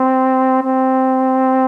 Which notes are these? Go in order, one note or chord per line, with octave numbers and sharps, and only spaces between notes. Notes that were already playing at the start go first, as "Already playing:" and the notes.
Already playing: C4
C4